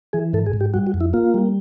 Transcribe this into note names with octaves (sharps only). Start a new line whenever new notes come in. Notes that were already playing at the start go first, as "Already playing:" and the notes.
E3 G#4
G#2 A4
G#4
G#2
G4
G3 F#4
F#4
F2
E4
A#3 F4
G3